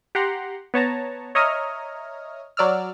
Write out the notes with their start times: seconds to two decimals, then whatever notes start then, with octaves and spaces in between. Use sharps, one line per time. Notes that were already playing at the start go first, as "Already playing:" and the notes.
0.15 G4 F#5 A#5 C6
0.74 B3 C#5 A5 A#5
1.35 C#5 D#5 E5 A#5 D#6 F6
2.57 F#3 D5 E6 F6